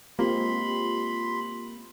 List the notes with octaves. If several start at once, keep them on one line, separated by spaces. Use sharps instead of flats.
G#3 A#3 C4 F4 G4 B5 C6